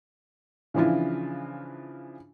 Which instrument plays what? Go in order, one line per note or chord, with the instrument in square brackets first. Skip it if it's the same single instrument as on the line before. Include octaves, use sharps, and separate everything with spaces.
[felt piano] C#3 E3 F3 D4 E4 F4